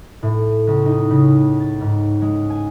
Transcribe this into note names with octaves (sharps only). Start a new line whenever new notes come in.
A2
C#2
D#4
C#3
A6
G#2
G#3
G#5